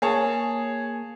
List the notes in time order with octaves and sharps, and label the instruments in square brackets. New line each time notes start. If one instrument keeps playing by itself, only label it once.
[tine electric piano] A#3 [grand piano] G#4 C#5 A5